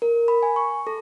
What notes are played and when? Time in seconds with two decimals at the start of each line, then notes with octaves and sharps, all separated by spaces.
0.02 A#4
0.28 B5
0.43 G#5
0.56 C#6
0.87 A4